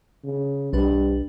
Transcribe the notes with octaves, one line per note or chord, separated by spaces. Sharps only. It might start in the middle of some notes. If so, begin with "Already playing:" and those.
C#3
B1 G3 D4 B4